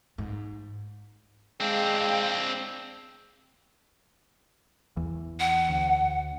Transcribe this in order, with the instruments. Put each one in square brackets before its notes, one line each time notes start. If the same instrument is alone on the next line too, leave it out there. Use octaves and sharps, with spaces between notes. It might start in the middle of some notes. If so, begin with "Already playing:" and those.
[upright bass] G#2
[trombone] G#3 [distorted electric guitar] C4 D4 [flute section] F5 G5
[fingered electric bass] E2 E3
[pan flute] F#5
[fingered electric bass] D2